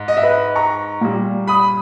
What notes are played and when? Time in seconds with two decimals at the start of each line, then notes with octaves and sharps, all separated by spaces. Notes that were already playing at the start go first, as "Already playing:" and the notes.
Already playing: G#2
0.08 D#5
0.17 E5
0.23 B4 D#5
0.56 A#5 C#6
1.01 A#2 G3
1.47 B5 D#6